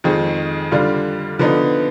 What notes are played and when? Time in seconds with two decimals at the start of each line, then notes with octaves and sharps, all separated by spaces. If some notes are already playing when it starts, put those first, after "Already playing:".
0.04 F2 D#3 G#3
0.71 D3 G3 D4 F4
1.39 D3 F3 B3 D#4